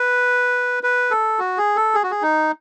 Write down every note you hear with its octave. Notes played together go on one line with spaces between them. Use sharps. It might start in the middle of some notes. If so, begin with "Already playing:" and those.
Already playing: B4
B4
A4
F#4
G#4
A4
G#4
F#4
G#4
D#4